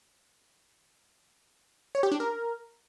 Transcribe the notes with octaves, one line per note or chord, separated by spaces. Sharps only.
C#5
G4
D4
A#4